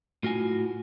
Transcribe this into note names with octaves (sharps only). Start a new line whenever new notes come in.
A2 F4 F#4 G#5